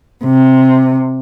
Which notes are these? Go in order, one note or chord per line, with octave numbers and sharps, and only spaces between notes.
C3